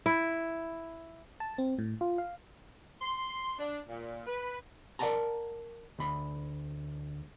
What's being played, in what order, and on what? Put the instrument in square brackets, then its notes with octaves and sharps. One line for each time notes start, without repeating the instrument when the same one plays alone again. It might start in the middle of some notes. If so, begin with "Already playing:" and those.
[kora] E4
[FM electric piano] A5
C4
A2
F4
F5
[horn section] C6
D4
A#2
B4
[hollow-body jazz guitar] A#4 D5 E5 F#5 A5 A#5
D2 B5